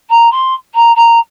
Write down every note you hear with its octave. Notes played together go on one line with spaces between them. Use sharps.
A#5
C6
A#5
A#5